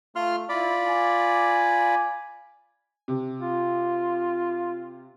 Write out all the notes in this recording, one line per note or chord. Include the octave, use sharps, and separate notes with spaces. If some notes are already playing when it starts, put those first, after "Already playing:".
A3 F4 C6 F6
E4 F4 D5 B5
G#5
C3
F4